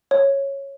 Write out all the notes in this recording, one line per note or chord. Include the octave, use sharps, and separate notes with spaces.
C#5